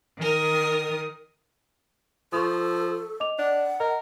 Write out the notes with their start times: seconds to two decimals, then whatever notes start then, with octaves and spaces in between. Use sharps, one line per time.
0.18 D#3 A#4 D#6
2.33 F3 A4 C#6 D#6
3.20 D#5 D6 F7
3.39 D4 F#5
3.80 A#4 D#5